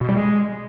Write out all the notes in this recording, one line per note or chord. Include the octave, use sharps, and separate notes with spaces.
B2
G3
G#3